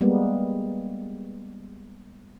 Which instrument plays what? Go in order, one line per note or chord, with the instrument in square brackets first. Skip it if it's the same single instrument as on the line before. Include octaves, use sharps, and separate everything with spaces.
[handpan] G3 G#3 A#3 B3